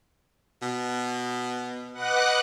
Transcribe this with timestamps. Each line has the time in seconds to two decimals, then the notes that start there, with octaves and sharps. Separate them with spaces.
0.62 B2
1.94 B4 D#5 F#5 D6 F#6